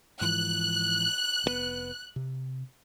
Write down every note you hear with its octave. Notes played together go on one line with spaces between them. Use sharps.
G#2 E3 F3 F#6
F1 B2 B3
C3